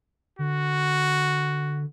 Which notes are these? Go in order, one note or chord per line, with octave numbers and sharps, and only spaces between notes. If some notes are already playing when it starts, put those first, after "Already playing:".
D3 F#4